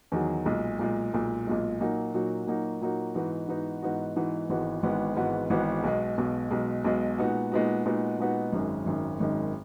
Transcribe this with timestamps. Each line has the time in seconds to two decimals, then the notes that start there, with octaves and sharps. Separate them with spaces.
0.12 E2 D#3 F#3
0.46 B1 A#2 G#3
0.79 B1 A#2 G#3
1.14 B1 A#2 G#3
1.47 B1 A#2 G#3
1.81 A#2 F#3 A#3 D#4 F#4
2.14 A#2 F#3 A#3 D#4 F#4
2.47 A#2 F#3 A#3 D#4 F#4
2.81 A#2 F#3 A#3 D#4 F#4
3.15 G#2 E3 B3 D#4 F#4
3.48 G#2 E3 B3 D#4 F#4
3.82 G#2 E3 B3 D#4 F#4
4.16 G#2 E3 B3 D#4 F#4
4.49 G#1 G#2 E3 B3 F#4
4.83 G#1 G#2 E3 B3 F#4
5.16 G#1 G#2 E3 B3 F#4
5.50 G#1 G#2 E3 B3 F#4
5.84 B1 B2 G#3
6.18 B1 B2 G#3
6.51 B1 B2 G#3
6.84 B1 B2 G#3
7.18 A#2 G#3 B3 D#4 F#4
7.52 A#2 G#3 B3 D#4 F#4
7.86 A#2 G#3 B3 D#4 F#4
8.18 A#2 G#3 B3 D#4 F#4
8.52 G#1 F#2 D#3 G#3
8.86 G#1 F#2 D#3 G#3
9.20 G#1 F#2 D#3 G#3